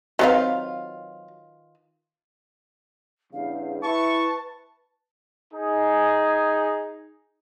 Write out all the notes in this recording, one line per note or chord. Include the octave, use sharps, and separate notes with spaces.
D#3 F#3 C4 F4 B4 F5
E2 G2 C#3 F5
E4 B4 A5 C#6
D#4 G#4